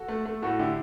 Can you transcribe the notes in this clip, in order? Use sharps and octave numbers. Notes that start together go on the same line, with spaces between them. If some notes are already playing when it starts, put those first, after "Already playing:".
Already playing: F#4 A4
A3
A3
A2 F#4 A4
D3 E4 G4